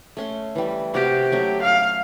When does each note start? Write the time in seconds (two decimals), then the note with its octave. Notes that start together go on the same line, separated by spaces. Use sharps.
0.17 A3 C#4 C6
0.55 E3 G3
0.94 C3 F#4 G4 F5
1.32 F#3 A3 C#4
1.62 F5